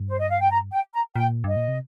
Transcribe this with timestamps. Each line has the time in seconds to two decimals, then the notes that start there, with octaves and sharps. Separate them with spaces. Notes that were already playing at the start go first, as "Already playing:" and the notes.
Already playing: G2
0.09 C5
0.19 D#5
0.30 F5
0.41 G5
0.51 A#5
0.72 G5
0.94 A#5
1.15 A#2 G5
1.44 G2 D#5
1.56 A#2
1.68 C3